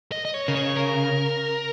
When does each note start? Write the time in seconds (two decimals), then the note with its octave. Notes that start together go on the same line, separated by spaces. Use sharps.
0.12 D#5
0.25 D#5
0.34 C#5
0.48 C#3 A#4
0.55 C#5
0.77 A#4